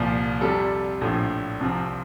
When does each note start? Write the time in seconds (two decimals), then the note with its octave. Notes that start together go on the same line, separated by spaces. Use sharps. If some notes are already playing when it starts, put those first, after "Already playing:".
Already playing: C2 A#2 F3
0.41 F2 C3 G3 A4
1.01 A#1 A2 F3
1.61 C2 C3 F3 C4